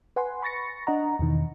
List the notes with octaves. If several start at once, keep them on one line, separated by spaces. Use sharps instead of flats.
B4 F#5 G#5 C6
B5 C#6 A6 A#6 C#7
D4 D#5 F#5 A#5
E2 B2 D#3 E3